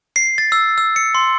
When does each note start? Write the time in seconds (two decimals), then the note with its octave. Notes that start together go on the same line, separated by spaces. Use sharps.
0.16 C7
0.38 A6
0.52 E6
0.78 E6
0.96 C#7
1.15 C6